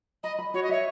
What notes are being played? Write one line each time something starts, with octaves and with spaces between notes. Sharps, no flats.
D#5 B5
B5
F#4 C#5
D#5
C#5 E5